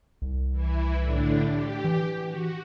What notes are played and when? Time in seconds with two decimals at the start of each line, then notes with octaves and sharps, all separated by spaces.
0.22 C2
0.52 E3 E4
1.01 A2 D3 D4
1.50 G4
1.85 E3
2.28 F#4